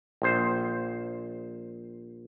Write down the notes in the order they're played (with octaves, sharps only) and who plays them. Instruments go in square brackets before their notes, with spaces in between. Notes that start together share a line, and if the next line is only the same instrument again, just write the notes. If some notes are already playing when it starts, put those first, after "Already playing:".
[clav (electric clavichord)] A#1 C5